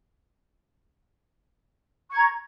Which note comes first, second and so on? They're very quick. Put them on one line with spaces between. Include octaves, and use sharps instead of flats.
C#6 G#6 A#5